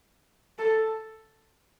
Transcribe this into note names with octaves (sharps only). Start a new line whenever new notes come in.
A4